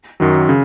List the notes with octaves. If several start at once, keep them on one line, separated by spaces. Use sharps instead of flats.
F#2 D#3 F#3
C#3